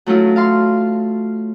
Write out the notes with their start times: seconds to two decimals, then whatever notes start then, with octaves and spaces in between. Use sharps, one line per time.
0.06 F#3 A3 C#4 E4 F4
0.36 F5 A5 C6 F6